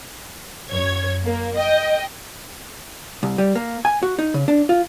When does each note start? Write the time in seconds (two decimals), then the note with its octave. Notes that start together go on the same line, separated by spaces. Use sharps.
0.71 F#2 C#5 G#6
1.25 A#3
1.57 D#5 G5
3.23 C2
3.38 G3
3.55 A#3
3.85 G#5
4.03 F#4
4.19 D#4
4.34 C#3
4.48 D4
4.69 F4